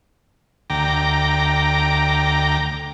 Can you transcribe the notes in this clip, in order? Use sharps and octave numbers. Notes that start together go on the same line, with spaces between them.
D2 G5 A#5 D6